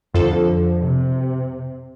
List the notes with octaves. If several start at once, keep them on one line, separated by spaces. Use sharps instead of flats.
F2 D3 F3 F4 A4
C3